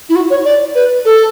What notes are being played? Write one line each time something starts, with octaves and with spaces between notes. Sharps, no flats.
E4
F#4
C#5
D5
B4
A4